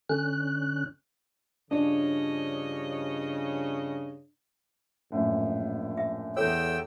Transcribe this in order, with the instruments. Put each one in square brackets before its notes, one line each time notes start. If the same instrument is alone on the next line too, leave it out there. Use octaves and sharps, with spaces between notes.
[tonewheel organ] D3 C#4 F#6
[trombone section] G2 C#3 [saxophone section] F3 C#5 D#5 [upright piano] D4
[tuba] A#1 [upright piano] F#2 A2
[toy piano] E5
[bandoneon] E2 G5 E6 [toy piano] A4 C#5